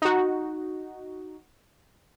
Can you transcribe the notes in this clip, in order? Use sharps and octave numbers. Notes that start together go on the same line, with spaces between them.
D#4 F#4